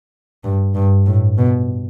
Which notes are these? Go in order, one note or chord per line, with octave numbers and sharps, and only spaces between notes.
G2
G2
A2
B2